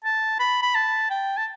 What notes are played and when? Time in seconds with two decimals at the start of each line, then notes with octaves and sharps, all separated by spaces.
0.04 A5
0.40 B5
0.62 B5
0.75 A5
1.10 G5
1.37 A5